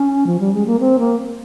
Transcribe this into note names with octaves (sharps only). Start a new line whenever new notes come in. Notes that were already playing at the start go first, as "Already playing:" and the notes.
Already playing: C#4
F3
G3
G#3
A#3
C4
A#3